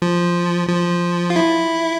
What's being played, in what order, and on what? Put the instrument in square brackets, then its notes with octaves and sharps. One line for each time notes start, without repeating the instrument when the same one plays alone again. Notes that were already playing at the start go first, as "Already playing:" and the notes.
[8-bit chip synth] F3
F3
F4
E4